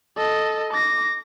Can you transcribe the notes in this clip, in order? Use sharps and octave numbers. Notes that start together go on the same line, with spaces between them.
A4 D#5
D6 A#6